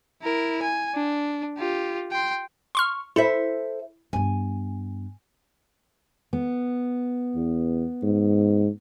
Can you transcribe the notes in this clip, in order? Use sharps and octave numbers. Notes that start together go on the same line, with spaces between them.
E4 A#4
G#5
D4
F4 G4
G5 C6
C6 C#6 F6
E4 A4 C5 E5
G2 B3 G#5
B3
E2
G#2